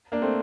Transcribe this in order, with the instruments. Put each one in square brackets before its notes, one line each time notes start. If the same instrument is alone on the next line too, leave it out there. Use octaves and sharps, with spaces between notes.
[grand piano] A#3 D4
A3 C4